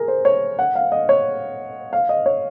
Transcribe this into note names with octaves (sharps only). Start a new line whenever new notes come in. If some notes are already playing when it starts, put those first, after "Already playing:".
Already playing: G#4 A#4
C5
C#5
F#5
F5
D#5
C#5
F5
D#5
C#5